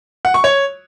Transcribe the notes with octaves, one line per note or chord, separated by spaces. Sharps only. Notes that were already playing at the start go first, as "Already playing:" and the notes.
F#5
C#6
C#5